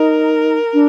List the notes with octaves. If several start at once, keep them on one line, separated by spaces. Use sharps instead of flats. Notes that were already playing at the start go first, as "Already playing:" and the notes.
Already playing: D#4 A#4
D4